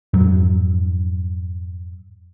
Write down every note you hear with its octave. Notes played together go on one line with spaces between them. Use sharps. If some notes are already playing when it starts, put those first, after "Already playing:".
F2 G#2 F#3